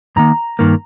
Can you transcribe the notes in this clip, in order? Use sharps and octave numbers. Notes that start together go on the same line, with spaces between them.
G2 D#3 A#3 A#5
G2 D#3 A#3